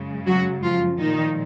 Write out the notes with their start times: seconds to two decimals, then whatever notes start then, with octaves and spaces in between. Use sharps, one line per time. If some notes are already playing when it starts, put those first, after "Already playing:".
Already playing: F#2 C#3 G#3
0.27 F#3 F#4
0.63 F3 F4
0.99 A#2 D#3 F3 G#3 D#4